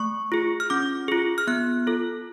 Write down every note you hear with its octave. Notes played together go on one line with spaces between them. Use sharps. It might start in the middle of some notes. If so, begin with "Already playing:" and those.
Already playing: A3 C#6
F4 G#4
F6
C#4 D6
F4 G#4
F6
B3 F#6
F4 A4